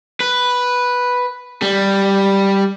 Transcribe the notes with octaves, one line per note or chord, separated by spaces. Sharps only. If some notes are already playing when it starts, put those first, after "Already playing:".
B4
G3